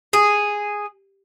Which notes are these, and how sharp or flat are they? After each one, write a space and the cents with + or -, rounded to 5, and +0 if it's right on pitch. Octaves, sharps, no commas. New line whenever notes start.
G#4 -5